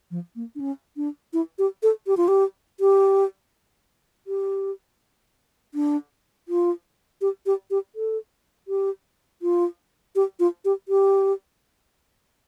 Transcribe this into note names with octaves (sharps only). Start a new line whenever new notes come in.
F3
A#3
D4
C#4
D4
E4
G4
A4
G4
F4
G4
G4
G4
D4
F4
G4
G4
G4
A4
G4
F4
G4
F4
G4
G4